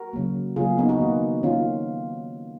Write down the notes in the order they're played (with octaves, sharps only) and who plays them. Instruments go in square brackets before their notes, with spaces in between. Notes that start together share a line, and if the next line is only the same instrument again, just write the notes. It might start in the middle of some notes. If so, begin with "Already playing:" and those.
Already playing: [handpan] F#4 A#4
C#3 F#3 A#3
C#3 F#3 A#3 F4 G#4
B3 D#4
D#4 F#4
D#3 A#3
D#3 A#3 C#4 F4